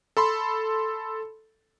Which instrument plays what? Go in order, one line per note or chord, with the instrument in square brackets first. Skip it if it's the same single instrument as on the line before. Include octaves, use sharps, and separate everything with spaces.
[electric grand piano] A4 B5 C6